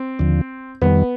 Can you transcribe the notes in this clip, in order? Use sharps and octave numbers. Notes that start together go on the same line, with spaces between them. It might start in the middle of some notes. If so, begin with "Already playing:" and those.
Already playing: C4
D#2 D3 F3
F2 D#3 G3 B3